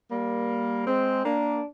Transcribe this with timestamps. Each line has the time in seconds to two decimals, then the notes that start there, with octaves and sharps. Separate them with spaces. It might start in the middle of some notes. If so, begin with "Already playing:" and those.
0.10 G3 A#3
0.87 G#3 C4
1.24 A#3 D4